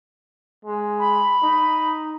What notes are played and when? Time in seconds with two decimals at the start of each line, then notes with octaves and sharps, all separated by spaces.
0.65 G#3
0.99 B5
1.43 D#4